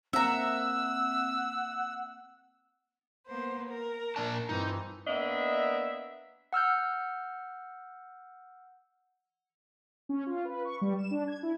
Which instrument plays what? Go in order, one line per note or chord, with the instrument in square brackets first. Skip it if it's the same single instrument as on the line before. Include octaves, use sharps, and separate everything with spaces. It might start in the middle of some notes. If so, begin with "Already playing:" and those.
[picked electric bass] A#3 C4 [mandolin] E5 A#5 [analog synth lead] F#5 [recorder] E6
[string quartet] A#3 B3 C5
A#4
[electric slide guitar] A#2 D4 A5
[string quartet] G2 E3 C4 [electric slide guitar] D#4
[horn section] A#3 B3 D4 D#5 E5
[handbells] F#5 E6 F6 G6
[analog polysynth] C#4
F4
B4
C#6
G3
E7
D4
G#6
E4